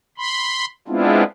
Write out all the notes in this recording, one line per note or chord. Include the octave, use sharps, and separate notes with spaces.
B5 C6
G#3 B3 C4 D4 E4 F4